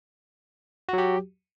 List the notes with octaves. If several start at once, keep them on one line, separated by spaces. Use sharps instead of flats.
F#3 F#4 G4